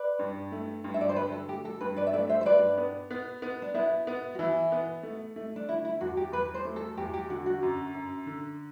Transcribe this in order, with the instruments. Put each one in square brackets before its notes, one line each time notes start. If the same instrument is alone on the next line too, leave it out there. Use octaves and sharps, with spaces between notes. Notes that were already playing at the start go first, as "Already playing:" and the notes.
Already playing: [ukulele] B4 D5
[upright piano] G2
A3
G2
[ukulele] E5
D5
C5
[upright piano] D3 [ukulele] B4
[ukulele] A4
[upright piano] A3 [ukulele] G4
[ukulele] A4
[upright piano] G2 [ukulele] B4
[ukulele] B4 D5
E5
[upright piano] A3 [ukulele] B4 D5
[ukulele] C5 E5
C5
[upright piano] G2 [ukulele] B4 D5
[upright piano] B3
B3
B3
[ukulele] D4
[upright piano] B3 [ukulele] E4
[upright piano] B3
[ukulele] F#4
[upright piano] E3 [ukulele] E4
[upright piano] B3
A3
A3
[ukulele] D4
[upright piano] D3 [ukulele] E4
[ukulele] E4
[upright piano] E2 [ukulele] F#4
[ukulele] G4
[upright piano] E2 [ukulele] B4
[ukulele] C5
[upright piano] A3
[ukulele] A4
[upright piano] E2 [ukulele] G4
[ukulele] G4
[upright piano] D3 [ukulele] F#4
[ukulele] F#4
[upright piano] F#2
F#2
D3